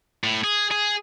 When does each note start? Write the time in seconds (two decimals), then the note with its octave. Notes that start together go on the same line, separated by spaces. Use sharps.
0.24 A2
0.44 G#4
0.71 G#4